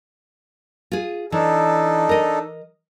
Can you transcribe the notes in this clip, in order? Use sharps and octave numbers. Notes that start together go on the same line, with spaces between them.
F4 G#4
E3 D4 D#4 A4
A#4 D#5